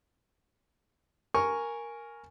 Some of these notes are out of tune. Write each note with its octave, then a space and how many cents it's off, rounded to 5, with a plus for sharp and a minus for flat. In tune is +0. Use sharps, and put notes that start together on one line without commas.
A#4 +0 G#5 +0 C#6 +0